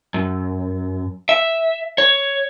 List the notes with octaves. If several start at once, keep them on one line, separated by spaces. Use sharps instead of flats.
F#2
E5
C#5